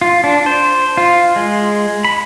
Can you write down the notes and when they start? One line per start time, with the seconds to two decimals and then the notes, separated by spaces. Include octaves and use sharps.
0.01 F4
0.24 D4
0.46 C5
0.97 F4
1.36 G#3
2.04 B5